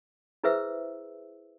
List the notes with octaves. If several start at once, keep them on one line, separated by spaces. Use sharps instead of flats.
E4 G#4 B4 C5 E5 E6